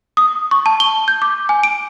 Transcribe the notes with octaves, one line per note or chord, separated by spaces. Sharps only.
D#6
C#6
A5
G7
G6
D6
G#5
D7